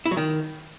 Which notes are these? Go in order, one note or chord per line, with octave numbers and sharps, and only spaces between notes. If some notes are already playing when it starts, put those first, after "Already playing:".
E4
F#3
D#3